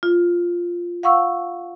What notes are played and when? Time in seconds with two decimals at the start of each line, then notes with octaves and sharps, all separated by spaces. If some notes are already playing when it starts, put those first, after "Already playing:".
0.03 F4
1.03 F5 F#5 C#6 E6